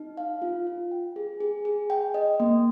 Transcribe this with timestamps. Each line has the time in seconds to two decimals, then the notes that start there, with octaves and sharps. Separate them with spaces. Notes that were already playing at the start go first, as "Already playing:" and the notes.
Already playing: D#4
0.17 F5
0.42 F4
0.67 F4
0.91 G5
1.16 G#4
1.40 G#4
1.65 G#4
1.90 G5
2.14 D#5
2.40 A#3